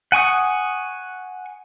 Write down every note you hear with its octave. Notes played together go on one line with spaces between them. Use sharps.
F#5 G#5 C#6 D#6